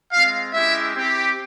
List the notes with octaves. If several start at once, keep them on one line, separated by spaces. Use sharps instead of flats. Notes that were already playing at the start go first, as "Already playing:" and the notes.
G#3 C4 F4 F5
G#3 C#4 E4 G4 E5
C4 E4 G4